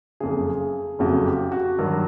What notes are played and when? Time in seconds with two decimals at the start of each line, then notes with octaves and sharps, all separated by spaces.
0.20 F#1 F2 C#3 G#4
0.99 F#1 F2 C#3 F#4
1.26 G4
1.52 F#4
1.79 G2 D#3 F#3